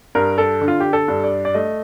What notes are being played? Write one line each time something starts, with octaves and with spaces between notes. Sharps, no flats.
G2 A#4
A4
D3
F4
G4
A4
G2
D5
D5
A3 D#5